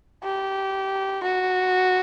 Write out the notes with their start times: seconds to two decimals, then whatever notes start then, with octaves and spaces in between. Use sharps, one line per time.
0.24 G4
1.23 F#4